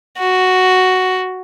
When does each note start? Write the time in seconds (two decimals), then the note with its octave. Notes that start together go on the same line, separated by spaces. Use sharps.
0.18 F#4